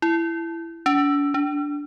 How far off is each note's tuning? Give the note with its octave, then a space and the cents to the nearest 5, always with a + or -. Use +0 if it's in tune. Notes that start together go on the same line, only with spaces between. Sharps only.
E4 +15
D4 -45
D4 -10